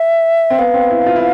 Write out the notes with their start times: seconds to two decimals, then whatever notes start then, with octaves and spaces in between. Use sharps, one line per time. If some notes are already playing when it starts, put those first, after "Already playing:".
Already playing: E5
0.50 C4
0.58 B3 F5
0.74 C4
0.90 E4
1.06 F4
1.16 E4